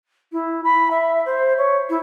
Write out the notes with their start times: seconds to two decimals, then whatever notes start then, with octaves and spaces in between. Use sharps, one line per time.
0.32 E4
0.64 B5
0.91 E5
1.26 C5
1.58 C#5
1.89 E4